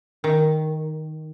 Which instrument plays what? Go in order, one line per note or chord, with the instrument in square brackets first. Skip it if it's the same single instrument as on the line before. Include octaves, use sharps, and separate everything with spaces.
[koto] D#3